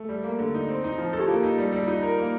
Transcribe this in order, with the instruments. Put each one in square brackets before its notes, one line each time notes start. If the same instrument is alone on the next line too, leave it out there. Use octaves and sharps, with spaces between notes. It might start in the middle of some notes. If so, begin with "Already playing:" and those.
Already playing: [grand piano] A3
G3
A#3
D3
D#4
C4
D#4
F3
A4
[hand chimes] G4
[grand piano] A#3 [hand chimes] F4
[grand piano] D#4
G3
G3
[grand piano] D#4 [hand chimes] F4
[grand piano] A#4
A#3